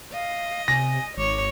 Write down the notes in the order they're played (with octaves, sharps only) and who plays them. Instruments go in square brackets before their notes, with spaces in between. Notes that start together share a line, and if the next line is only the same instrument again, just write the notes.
[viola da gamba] D#5 [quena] F5
[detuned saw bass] C3 [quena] G#5 [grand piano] A#6
[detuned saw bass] G#1 [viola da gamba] C#5 [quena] D6